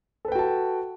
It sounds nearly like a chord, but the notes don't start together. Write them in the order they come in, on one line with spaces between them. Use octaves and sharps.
A4 B4 G5 F#4 A5